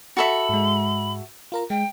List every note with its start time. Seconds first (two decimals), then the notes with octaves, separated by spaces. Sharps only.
0.17 F#4 A4 E5 B5
0.49 G#2 G#3
1.52 F4 A#4 A#5
1.70 G#3 G5